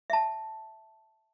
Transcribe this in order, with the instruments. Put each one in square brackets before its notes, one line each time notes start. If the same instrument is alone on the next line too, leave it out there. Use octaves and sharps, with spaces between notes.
[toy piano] E5 A5